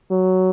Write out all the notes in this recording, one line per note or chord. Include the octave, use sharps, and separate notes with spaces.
F#3